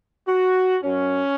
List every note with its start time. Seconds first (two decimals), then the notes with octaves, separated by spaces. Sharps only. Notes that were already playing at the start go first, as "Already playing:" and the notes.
0.26 F#4
0.82 F#2 F#3 C#4